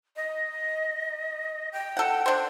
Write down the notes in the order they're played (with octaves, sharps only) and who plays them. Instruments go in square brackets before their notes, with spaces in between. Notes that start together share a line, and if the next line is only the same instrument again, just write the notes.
[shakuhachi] D#5
G5
[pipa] A4 F#5
D4 C5